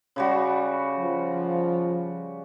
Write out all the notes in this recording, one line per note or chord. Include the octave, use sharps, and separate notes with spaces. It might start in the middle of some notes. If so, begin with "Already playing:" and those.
C#3 G3 F#4
F3